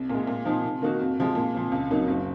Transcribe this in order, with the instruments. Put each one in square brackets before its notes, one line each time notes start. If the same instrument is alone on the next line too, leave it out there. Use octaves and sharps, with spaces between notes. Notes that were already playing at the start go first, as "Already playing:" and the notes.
Already playing: [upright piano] C2
A#2 G#3
A#2
F3 C4 D#4
C3
D#3 A#3 D#4 F#4
F2
C3 F3 G#3
A#2
F3 C4
C#2
C3 F#3 A#3 D#4
F#1